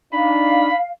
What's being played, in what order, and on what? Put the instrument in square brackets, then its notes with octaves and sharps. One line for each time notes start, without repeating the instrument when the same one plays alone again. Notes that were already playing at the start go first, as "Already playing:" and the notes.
[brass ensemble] D4 D#4 [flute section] F5 [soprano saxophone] B5